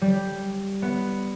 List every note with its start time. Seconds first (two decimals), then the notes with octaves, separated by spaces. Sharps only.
0.02 G3
0.82 B3